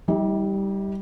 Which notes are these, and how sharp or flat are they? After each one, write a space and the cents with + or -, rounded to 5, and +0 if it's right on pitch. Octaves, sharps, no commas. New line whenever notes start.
G3 +0 D#4 +45